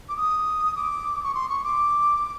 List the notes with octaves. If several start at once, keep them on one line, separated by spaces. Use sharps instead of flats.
D6
D#6
D6
C#6
C6
C#6
D6